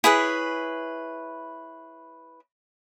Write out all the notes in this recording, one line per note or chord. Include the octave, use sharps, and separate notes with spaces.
E4 G#4 B4 C#5